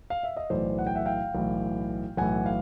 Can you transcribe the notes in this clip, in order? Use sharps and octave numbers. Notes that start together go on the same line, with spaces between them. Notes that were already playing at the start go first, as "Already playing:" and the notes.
F5
E5
D#5
B1 A2 E3 C5 D5
F#5
G5
E5 F#5
F5 G5
B1 A2 E3
B1 A2 E3 F#5 G#5
F5